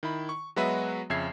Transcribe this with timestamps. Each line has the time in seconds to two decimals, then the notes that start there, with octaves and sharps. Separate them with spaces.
0.03 D#3 E4 B5
0.29 C#6
0.56 F#3 G#3 B3 F#4 B4 E5
1.10 F2 C#3 E5 G#6 C7